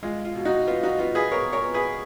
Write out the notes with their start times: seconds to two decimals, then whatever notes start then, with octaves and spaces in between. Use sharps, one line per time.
0.03 G#3 F4
0.25 F4
0.35 B2
0.45 D#4 F#4
0.67 B3 F4
0.83 D#4 F#4
0.99 B3 F4
1.15 G#4 B4
1.32 B3 A#4 C#5
1.53 A#4 C#5
1.63 B3
1.74 G#4 B4